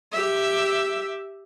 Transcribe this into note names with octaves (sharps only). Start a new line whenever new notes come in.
G4 E5